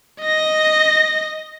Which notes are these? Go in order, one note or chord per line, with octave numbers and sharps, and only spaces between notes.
D#5 A#6